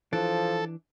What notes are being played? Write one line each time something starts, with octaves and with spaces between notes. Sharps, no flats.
E3 F3 D4 A4